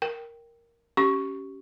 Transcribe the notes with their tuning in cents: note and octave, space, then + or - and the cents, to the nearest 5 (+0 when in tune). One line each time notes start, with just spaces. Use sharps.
A#4 +0 G5 +0
C#4 +0 G4 -20 C#6 +0